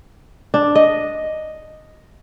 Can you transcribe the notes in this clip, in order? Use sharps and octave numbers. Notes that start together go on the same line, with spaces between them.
D4
D#5